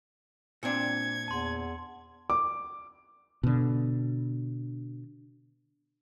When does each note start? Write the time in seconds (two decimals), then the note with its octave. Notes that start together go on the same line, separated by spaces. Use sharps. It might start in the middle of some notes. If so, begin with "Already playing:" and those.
0.63 A#2 C4 D4 G#6 C#7
1.28 E2 A5 C6
2.30 D6
3.43 B2 D3